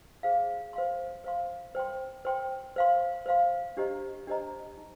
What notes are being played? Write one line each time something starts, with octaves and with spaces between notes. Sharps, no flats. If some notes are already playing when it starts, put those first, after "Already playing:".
G#4 C5 F5
C5 F5 C6
C5 F5 C6
C5 G5 C6
C5 G5 C6
C5 F5 C6
C5 F5 C6
D4 G4 C5 D#5 A#5
D4 G4 C5 D#5 A#5
D#4